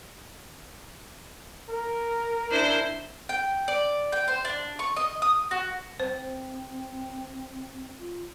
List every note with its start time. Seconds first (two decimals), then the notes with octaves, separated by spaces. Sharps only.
1.70 A#4
2.50 D4 E4 C5
3.29 G5
3.68 D5
4.12 G5
4.28 C5
4.45 D4
4.79 C#6
4.96 D#5
5.22 D#6
5.51 F#4
6.00 C4 C5
7.99 F4